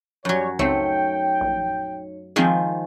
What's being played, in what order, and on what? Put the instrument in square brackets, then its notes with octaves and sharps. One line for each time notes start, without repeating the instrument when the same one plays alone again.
[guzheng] F#2 F#3 [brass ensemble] G3 C#5
[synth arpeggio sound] C#2 C4 [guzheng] A3 [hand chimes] D#4 C#5 C#7 [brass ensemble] G5
[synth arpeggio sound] A#1
[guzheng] D#3 F3 G#3 [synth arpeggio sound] C4 G#4